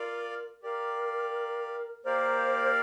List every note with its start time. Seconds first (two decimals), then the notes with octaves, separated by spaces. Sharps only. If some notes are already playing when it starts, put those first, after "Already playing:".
Already playing: F4 A#4 D5 F5
0.63 G4 A#4 D5 F5
2.05 A#3 G4 A#4 C5 D5 F5